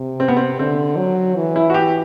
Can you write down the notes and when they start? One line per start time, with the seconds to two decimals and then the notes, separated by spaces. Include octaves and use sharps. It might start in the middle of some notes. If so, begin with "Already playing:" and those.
Already playing: C3
0.20 C4
0.28 B3
0.37 C4
0.59 D3 C4
0.97 F#3
1.36 E3
1.56 E4
1.70 F#4
1.74 G4